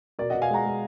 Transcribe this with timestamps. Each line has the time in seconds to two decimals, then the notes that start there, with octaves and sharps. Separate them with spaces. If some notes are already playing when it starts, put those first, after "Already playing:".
0.19 B2 A#4 D5
0.30 D#5 F#5
0.34 B2
0.42 F5 G#5
0.50 G#3 F#5 A#5
0.65 G#3